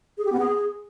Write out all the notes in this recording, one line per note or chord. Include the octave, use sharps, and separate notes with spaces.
G#4
G4
B3
G#4